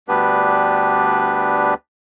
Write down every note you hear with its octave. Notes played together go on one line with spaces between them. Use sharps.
D2 G3 B3 D4 G4 B4